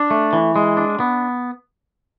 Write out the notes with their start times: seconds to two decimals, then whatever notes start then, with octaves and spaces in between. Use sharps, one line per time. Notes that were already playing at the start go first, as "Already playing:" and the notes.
Already playing: D4
0.11 A3
0.33 E3
0.56 G#3
0.77 D4
1.00 B3